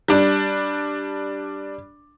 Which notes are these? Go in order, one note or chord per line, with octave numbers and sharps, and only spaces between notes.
G3 D4